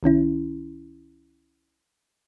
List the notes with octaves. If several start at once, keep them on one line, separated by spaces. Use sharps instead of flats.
C2 D#3 C#4 E4